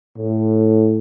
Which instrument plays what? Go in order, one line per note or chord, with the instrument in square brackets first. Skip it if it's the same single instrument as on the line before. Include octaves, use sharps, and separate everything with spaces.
[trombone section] A2